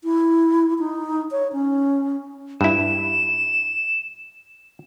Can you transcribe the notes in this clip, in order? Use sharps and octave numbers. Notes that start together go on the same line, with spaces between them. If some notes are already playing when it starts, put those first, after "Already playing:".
E4
D#4
C#5
C#4
G2 E4 E7